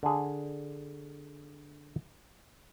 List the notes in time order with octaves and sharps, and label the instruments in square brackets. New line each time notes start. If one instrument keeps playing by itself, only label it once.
[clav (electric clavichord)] D3 G#4